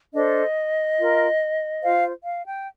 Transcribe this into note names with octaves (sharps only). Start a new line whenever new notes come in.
D4 A4 C5 D#5
F4 A#4
F4 C5 F5
F5
G5